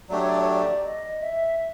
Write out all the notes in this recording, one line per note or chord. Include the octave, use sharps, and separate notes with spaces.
F#3 A3 D4 G4 D5
C#5
D5
C#5
D5
D#5
E5